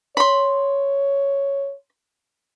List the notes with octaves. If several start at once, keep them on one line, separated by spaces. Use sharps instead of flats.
C#5 B5 C6